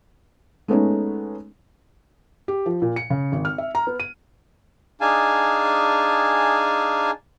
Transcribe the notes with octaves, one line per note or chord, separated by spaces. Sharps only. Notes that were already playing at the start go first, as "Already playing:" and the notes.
G#3 A3 B3 C#4 D#4
G4
F3
A#2
C#7
C#3
G#1
F6
E5
A#5
B3
D#7
D4 D#4 G#4 F5 G#5 A5